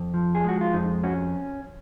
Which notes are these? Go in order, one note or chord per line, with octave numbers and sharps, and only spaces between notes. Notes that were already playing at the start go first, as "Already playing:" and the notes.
Already playing: F2
F3
G#4
G#3 F#4
F4
F2 D#4
C#4 F#4